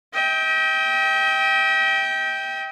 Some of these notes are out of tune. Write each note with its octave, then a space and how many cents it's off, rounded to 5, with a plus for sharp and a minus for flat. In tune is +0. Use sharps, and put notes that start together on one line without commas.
D#5 +45 G5 +0